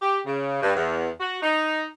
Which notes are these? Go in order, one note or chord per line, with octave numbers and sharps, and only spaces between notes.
G4
C#3
G2
E2
F#4
D#4